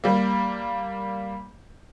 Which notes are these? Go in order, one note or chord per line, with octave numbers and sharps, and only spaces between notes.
G3 A#3